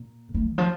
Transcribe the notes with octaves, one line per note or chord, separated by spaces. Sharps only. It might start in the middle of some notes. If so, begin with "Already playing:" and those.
Already playing: A#2
A#3
D#3
F3